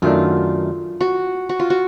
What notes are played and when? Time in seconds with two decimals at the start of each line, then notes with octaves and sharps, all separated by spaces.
0.02 F#2 D#3 F#3 A3 D4 F4
1.01 F#4
1.49 F#4
1.59 F4
1.70 F#4